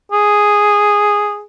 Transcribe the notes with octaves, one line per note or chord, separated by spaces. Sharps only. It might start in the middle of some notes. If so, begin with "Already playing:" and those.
G#4